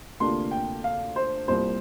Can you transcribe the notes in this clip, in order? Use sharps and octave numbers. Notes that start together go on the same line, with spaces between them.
D2 C3 A#3 D4 F4 C6
G5
F5
C5
C2 A#2 G3 C4 C5